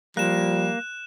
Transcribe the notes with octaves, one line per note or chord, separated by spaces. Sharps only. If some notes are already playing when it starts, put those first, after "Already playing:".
F3 G3 A#3 F#6 E7